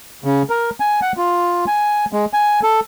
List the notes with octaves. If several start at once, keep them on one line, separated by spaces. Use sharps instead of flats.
C#3
A#4
G#5
F#5
F4
G#5
G#3
G#5
A4